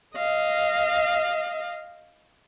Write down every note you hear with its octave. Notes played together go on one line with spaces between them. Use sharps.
D#5 F5